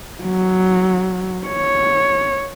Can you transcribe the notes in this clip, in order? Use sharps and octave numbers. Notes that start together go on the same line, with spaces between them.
F#3
C#5